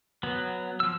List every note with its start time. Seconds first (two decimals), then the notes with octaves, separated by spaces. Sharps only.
0.23 F#3 B3
0.80 F3 E6